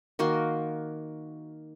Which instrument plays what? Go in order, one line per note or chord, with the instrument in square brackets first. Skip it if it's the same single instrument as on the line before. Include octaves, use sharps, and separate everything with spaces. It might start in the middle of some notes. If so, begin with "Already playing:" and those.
[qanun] D#3 A#3 F#4 C6